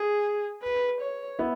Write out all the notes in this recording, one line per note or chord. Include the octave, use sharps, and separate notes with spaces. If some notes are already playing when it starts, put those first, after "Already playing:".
Already playing: G#4
B4
C#5
B3 E4